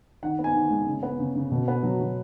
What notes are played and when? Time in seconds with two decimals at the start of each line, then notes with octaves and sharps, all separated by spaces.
0.22 D#3 F#5
0.39 B3
0.44 G#5
0.54 D#3
0.70 G#3
0.87 C#3
1.03 B3
1.19 C#3
1.35 C#3
1.51 B2
1.68 B3
1.83 F#3
2.00 F#3